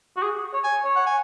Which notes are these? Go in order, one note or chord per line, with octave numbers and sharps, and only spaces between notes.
F#4
G#4
C#5
G#5
C#5
F#5
G#5